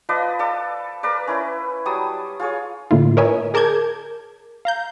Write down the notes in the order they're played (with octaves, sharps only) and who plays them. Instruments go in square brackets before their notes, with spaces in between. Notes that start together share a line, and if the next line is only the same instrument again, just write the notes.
[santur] F3 B4 D5 D#5
A4 D5
A#4 B4 D5
C#4 E4 B4
F#3 G3 A5 D#6
F4 G#4 C#5
[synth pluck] A2 D3 A#3 E4 F4
A#4 B4 C#5 D#5 E5 G#5
G#4 A#4 A5 D6 G6 G#6
F5 A#5 G6